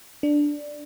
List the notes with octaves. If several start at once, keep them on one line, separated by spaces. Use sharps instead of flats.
D4